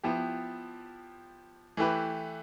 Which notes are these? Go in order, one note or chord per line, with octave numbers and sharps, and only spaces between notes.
F3 B3 E4 G4
E3 A3 E4 G4 B4